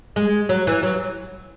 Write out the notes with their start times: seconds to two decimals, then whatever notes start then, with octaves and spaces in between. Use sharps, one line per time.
0.16 G#3
0.49 F#3
0.67 E3
0.83 F#3